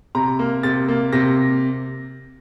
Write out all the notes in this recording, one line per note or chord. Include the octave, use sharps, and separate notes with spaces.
C3 A#5
A#3
C3 A6
A#3
C3 A#6